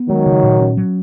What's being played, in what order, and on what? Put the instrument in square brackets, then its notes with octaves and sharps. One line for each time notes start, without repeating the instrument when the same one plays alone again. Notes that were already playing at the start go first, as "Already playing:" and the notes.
Already playing: [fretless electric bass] B3
[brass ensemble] D#3 F#3 [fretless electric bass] G#3
[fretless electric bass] C#3
A#2
C#4
F#3